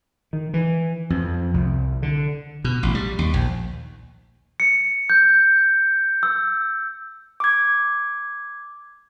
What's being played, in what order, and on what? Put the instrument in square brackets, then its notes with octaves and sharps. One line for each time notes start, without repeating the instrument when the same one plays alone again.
[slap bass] D#3
E3
F2
C2
D3
B2
A1
G3
D#2
A#1
[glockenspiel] C#7
G6
E6
[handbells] D6 G#6